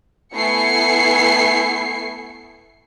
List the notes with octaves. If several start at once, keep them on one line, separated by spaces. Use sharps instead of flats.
A3 B3 E4 G#5 C7 C#7